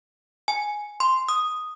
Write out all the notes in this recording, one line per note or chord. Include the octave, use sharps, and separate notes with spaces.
G#5
C6
D#6